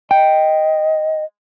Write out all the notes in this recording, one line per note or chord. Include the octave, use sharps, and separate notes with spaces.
D#5 G5